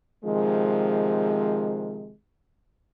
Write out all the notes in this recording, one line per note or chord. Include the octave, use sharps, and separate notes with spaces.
C3 D#3 F3 G#3